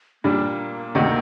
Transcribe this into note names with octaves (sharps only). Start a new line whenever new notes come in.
A#2 G3 A#3 D4
D2 C3 D#3